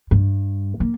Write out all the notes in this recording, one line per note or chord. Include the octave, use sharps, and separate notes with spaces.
G2
A#3